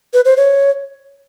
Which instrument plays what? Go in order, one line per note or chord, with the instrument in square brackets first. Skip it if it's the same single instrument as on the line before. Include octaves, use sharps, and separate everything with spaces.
[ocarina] B4
C5
C#5